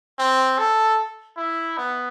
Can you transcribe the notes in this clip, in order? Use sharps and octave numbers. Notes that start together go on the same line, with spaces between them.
C4
A4
E4
B3